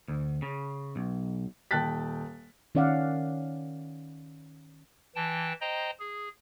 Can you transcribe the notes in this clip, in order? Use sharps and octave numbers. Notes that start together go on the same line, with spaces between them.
D2
C#3
B1
D#1 G5 A5 F#6 A6 B6
D#3 C#4 D5 F5 F#5
E3 G5 A5
C5 D#5 G5 A#5
G#4